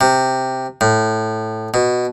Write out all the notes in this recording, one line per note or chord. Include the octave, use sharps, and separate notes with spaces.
C3
A2
B2